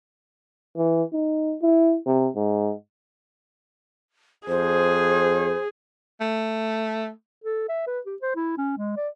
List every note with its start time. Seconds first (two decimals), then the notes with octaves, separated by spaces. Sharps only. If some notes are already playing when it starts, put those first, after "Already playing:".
0.77 E3
1.13 D#4
1.62 E4
2.06 C3
2.36 G#2
4.48 F2 G#4 C5
6.20 A3
7.44 A4
7.69 E5
7.87 B4
8.06 G4
8.22 C5
8.36 E4
8.58 C#4
8.78 G#3
8.97 D5